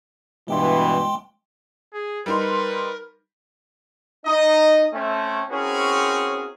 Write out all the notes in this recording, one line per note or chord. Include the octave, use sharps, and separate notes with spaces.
G2 B2 E3 G#3 G5 C6
G#4
G3 D#4 A#4 B4 C6
D#4 D#5
A3 C4 C#4
C4 C#4 E4 F#4 G#4 A#4